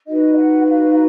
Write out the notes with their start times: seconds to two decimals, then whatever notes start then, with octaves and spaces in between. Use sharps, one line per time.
0.07 D#4 F#4 B4 D#5
0.36 F#5
0.66 F5